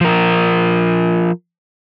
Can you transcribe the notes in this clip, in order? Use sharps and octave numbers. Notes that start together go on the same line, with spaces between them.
F3 A#4